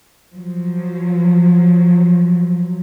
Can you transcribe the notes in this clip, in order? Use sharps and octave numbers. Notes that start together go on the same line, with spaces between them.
F3 F#3